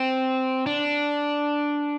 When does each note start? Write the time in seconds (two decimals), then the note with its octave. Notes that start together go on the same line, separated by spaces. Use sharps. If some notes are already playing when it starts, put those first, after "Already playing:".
Already playing: C4
0.67 D4